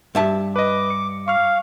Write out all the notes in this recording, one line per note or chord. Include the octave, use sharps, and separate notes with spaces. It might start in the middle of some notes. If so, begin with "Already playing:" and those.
G2 E5 A5
B4 D#5 D6
C#7
F5 C#6 F6